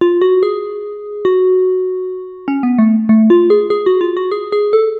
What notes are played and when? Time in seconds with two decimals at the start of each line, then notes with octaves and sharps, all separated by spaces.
0.01 F4
0.22 F#4
0.43 G#4
1.25 F#4
2.48 C#4
2.63 B3
2.78 A3
3.09 A3
3.30 F4
3.50 G#4
3.70 G#4
3.86 F#4
4.01 F4
4.17 F#4
4.32 G#4
4.52 G#4
4.73 A4